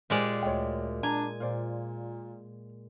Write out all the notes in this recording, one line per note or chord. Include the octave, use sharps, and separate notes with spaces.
A#2 G#3 G4 C5 D5 G#5
D2 C#5 D#5 G5
D4 G#5 A#5
A#2 F4 C5 D5